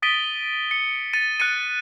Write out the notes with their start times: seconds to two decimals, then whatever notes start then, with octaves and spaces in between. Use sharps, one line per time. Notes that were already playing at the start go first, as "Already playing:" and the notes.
0.02 D#6 A6 B6 D7 D#7 G7
0.71 C#7
1.13 A6 C#7 D#7
1.40 F#6 A6 C#7 D#7